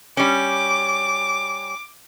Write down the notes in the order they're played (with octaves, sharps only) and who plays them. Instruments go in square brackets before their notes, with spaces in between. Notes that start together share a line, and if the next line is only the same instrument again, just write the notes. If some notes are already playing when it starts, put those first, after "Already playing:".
[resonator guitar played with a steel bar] G3 C#4 [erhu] D6